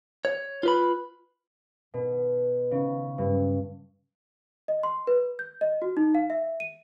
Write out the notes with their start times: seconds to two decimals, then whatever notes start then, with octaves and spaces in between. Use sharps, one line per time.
0.25 C#5
0.63 F4 B4 B5
1.94 B2
2.71 C#3
3.18 G2
4.68 D#5
4.83 C6
5.07 B4
5.39 G6
5.61 D#5
5.82 F#4
5.97 D#4
6.15 F5
6.30 E5
6.60 D#7